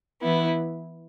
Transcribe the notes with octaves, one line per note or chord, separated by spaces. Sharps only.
E3 B3 E4